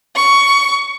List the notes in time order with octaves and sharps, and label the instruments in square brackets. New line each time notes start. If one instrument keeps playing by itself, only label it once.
[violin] C#6